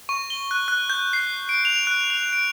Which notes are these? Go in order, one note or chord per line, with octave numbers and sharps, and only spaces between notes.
C#6
G7
F#6
F#6
G6
C7
D7
F7
F#6
F7
D7